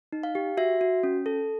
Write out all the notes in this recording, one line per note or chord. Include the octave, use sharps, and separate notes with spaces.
D#4
F5
G4
F#4 E5
F#4
C#4
A4